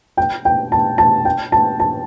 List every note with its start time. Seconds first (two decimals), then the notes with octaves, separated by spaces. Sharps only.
0.17 G5
0.45 G5
0.72 A5
0.98 A5
1.25 G5
1.52 A5
1.80 A5